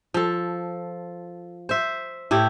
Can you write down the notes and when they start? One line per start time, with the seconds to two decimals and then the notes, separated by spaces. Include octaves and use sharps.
0.14 F3 A4
1.69 C5 E5
2.31 A2 E4 G4